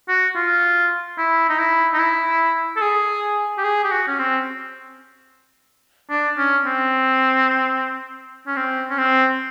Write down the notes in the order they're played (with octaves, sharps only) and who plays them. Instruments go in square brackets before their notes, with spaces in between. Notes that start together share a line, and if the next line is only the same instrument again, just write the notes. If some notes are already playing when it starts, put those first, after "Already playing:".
[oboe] F#4
F4
E4
D#4
E4
D#4
E4
A4
G#4
G4
G#4
G4
F#4
C#4
C4
D4
C#4
C4
C#4
C4
C#4
C4